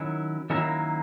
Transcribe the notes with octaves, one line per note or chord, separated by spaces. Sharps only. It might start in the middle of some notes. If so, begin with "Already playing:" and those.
Already playing: D#3 F#3 C#4 E4
D#3 F#3 A#3 C#4 E4